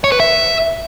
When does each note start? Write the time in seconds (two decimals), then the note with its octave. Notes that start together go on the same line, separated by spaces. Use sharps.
0.04 C#5
0.12 B4
0.20 E5